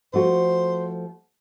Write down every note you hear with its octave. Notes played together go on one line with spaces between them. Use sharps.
F3 A3 F#4 C5